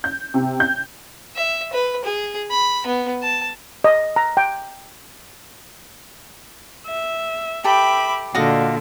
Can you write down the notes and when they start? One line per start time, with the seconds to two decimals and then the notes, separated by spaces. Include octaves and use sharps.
0.04 G6
0.34 C3
0.60 G6
1.36 E5
1.73 B4
2.04 G#4
2.51 B5
2.87 B3
3.22 A5
3.84 D#5
4.16 A#5
4.37 G5
6.85 E5
7.64 G4 A4 E5 G5 B5 D6
8.35 A#2 D3 F#4 D#5 F5